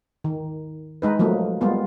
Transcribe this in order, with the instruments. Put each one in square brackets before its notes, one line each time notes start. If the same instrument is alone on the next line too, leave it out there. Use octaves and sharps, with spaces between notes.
[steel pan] D#3
G#3 D#4 B4
F3 F#3 A3 A#3
G3 G#3 A#3 B3 F4